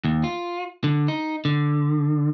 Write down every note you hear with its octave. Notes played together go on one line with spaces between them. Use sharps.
D#2
F4
D3
D#4
D3